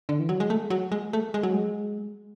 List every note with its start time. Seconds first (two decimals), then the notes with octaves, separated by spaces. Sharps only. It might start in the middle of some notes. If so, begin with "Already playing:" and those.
0.09 D3
0.19 E3
0.29 F#3
0.40 G#3
0.50 A3
0.70 F#3
0.92 G#3
1.13 A3
1.34 G#3
1.43 F#3
1.54 G#3